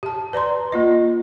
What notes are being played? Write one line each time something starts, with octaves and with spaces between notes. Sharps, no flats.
G4 A5
B4 D5 A#5 C6
A#3 F4 D#5